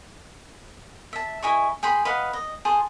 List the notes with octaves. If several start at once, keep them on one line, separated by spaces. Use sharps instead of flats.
E5 A5
E4 G#4 D#5 C#6
G#4 G5 B5 C6
B4 D#5 F5 F#5
D#5
G#4 C5 A5